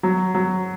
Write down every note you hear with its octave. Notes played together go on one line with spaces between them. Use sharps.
F#3
F#3